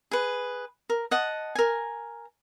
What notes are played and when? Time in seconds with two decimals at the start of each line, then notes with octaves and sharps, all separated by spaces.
0.11 G#4 B4
0.89 A#4
1.11 D#5 F#5 A5
1.55 A#4 G#5